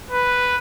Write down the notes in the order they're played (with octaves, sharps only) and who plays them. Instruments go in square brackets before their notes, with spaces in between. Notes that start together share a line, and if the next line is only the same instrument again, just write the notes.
[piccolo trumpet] B4